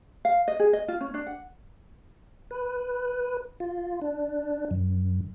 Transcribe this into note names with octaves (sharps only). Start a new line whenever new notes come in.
F5
D#5
G#4
D#5
F4
C#4
D4
F#5
B4
F4
D4
F#2